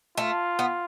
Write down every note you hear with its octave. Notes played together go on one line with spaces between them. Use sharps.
A3 F4
B3